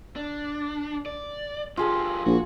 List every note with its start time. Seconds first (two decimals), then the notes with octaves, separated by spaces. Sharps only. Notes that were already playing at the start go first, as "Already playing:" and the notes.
0.16 D4
1.06 D5
1.77 F#2 F4 G4 G#4 A5
2.26 A#1 F#4